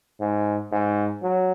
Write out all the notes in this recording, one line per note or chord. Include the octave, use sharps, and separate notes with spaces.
G#2
G#2
F#3